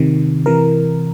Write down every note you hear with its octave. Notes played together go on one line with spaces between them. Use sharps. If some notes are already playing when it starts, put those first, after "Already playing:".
Already playing: C3 D#3
C3 E3 A#4